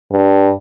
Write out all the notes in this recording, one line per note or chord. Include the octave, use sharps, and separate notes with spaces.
G2